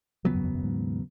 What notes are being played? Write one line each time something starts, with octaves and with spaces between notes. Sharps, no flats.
D#2 C#3 F3 F#3 B3
F#2
F2
F#2
G#2